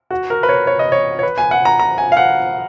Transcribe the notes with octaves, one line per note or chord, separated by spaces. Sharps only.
F#4
A#4
B4
C#5
C#5
D#5
C#5
C#5
B4
G#5
F#5
A#5
A#5
G#5
F5
F#5